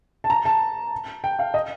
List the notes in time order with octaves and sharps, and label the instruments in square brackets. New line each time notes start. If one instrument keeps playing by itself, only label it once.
[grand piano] A5
A#5
A5
G5
F5
D#5